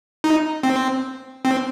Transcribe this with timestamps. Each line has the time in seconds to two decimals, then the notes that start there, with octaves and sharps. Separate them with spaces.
0.24 D#4
0.63 C4
1.45 C4